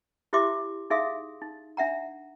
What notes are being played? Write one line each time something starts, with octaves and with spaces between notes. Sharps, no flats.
E4 G4 C5 E5 C6 D6
D#4 G#4 E5 F5 C6 D#6
D#4
D4 E5 F#5 A#5